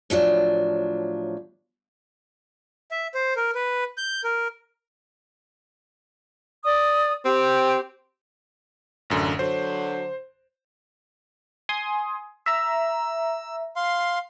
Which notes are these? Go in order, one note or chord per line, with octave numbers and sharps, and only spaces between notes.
A2 F3 F#3 D4
E5
C5
A#4
B4
G6
A#4
D5 D#6
C4 G4
A1 F#2 D3
D3 F#3 C5
G#5 C6 D#6
E5 A#5 E6
F5 C6